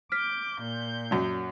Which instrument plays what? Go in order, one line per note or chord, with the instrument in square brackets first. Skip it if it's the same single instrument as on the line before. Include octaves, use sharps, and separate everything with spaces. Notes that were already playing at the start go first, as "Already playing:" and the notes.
[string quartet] D6 G6 [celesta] F6 B6
[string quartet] A#2 G6
[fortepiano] F#2 F#3